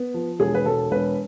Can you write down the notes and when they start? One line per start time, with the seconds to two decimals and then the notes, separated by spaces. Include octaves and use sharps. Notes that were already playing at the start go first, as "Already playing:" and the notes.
Already playing: B3
0.14 F3
0.39 E1 G#4
0.54 B4
0.66 E1 A4
0.91 E1 B4